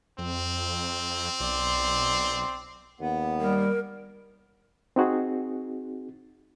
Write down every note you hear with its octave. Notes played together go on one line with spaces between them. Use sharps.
F2 C4
B1 D5 C6
D#2 B3
G3 A#4
C4 D#4 F#4 G#4